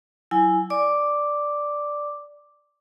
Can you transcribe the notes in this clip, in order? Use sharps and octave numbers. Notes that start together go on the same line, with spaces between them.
F#3 E4 G#5
D5 D6